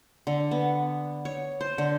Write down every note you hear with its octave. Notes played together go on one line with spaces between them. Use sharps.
D3
B3
C#5
C5
D3